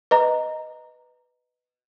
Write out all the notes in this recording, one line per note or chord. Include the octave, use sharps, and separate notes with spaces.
B4 D#5 A#5